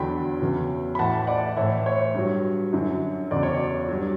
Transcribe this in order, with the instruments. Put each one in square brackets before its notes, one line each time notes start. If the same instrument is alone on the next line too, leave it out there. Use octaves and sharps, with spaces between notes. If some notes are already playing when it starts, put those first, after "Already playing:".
Already playing: [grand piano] E2 D3 F#3 G5 B5
E2 C#3 F#3
B5
A2 E3 F#5 A5
D5 F#5
A2 E3 C#5 E5
C#5
C#5
G2 F#3
F#2 D3 F#3
E2 C#3 F#3 D5
C#5
D5
G2 F#3